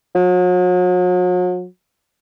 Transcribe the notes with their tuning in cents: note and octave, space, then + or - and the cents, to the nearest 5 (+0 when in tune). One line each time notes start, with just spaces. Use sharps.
F#3 -40